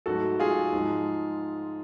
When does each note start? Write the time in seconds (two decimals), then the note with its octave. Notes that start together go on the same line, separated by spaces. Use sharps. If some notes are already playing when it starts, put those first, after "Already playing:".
0.06 G#2 F#3 A3 F#4 A4
0.40 F4 G#4
0.73 G#2 F3 G#3